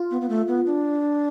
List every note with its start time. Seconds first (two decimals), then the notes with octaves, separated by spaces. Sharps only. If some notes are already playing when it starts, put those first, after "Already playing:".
Already playing: F4
0.11 B3
0.21 B3
0.29 A3
0.48 B3
0.66 D4